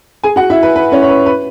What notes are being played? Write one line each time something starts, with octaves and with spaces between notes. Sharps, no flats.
G#4 G#5
F#4 F#5
E4 E5
B4
B4
C#4 C#5
C#5
B4
B4